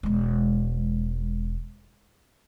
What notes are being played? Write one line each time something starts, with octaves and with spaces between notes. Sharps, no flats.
E1 G#3